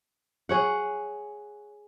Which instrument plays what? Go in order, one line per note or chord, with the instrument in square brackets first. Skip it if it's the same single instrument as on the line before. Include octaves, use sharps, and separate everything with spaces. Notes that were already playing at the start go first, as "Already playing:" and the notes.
[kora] G#4 C#5 F#5